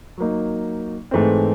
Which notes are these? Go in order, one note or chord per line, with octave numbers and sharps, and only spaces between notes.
F#3 A#3 D#4
G#2 E3 A3 C4